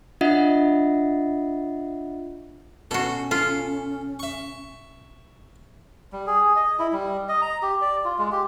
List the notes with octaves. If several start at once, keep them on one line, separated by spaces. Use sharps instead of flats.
D4 F4 D#5 E5 F#5
B2 C#4 F#4 A4
F4 A4
E5 C#6
G3
G#4
D#5
E4
G3
D#5
A#5
G4
D5
F4
G#3
G4